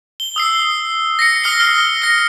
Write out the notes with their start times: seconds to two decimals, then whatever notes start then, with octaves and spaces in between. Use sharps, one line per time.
0.20 G7
0.36 D#6 E6 C7
1.19 A#6 C7 C#7
1.44 D#6 F6 C7 G7
1.60 F6 A#6
2.02 A#6 C#7